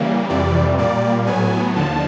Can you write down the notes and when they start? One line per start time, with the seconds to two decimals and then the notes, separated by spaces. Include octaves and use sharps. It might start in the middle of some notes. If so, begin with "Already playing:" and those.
Already playing: C#3 E3 G3 A#3
0.29 F2 C3 E3 G3 D5
0.78 A#2 G3 A#3 D5
1.26 A2 F#3 B3 G#5
1.76 D#2 D3 F3 A5